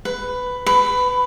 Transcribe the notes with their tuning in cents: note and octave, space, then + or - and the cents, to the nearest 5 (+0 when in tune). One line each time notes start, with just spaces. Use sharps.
B4 +10
B4 +15